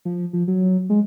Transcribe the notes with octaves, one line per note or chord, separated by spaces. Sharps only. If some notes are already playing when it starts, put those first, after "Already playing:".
F3
F3
F#3
G#3